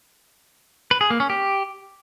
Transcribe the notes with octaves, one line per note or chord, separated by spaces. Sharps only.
B4
G#4
A#3
C#4
G4